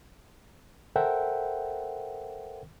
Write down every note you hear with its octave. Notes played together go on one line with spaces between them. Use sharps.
A4 A#4 C5 E5 F#5 G5